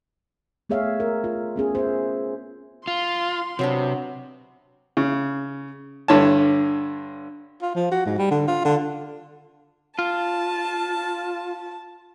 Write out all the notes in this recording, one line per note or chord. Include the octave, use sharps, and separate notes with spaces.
A3 B3 G#4 C#5 E5 F5
A#4
F4
B3 C#4 G#4
C5 E5
F4 C6
C3 F#3 B3 D4
C#3
G2 D3 C#5 A5
F4
F3
F#4
G#2
G3
D3
F4
D3
F4 A5